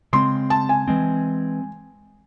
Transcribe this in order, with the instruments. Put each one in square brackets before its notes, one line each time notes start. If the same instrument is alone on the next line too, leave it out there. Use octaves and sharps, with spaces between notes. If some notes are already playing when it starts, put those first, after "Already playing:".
[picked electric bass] C#3 G#3 C4 [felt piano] C6
[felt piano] A5
G#5
[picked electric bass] E3 G#3 C4